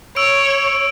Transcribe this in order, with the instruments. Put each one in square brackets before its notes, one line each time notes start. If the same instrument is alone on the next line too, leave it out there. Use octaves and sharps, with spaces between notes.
[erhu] C#5 [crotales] E6 D7